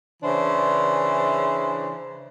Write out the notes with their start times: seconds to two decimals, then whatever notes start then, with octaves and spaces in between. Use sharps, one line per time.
0.22 C#3 E3 D4 C5